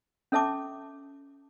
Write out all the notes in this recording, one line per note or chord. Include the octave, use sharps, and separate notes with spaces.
C#4 A4 E5 A5 D6